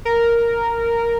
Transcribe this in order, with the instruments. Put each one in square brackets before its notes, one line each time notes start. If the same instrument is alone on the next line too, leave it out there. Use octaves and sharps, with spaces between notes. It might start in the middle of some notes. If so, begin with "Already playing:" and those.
[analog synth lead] A#4